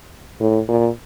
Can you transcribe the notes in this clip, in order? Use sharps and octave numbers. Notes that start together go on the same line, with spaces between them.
A2
A#2